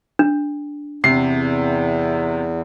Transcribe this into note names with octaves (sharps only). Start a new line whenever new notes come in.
D4
E2 C3 C7